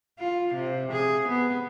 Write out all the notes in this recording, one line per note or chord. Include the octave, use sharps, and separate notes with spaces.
F4
C3
G#4
B3